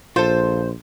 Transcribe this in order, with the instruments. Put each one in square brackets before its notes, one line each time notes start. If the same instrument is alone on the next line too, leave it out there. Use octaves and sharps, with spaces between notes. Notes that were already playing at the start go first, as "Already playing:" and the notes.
[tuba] A#1 [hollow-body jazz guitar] F4 A4 [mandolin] C5